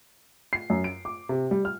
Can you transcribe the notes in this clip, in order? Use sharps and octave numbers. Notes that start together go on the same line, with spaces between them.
C7
F#2
D7
D6
C3
G3
F6